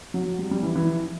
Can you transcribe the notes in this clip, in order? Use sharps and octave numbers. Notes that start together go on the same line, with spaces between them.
F#3
G3
G3
E3
E3